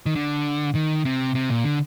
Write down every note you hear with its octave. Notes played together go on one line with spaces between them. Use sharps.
D#3
D3
D#3
C3
C3
A#2
D3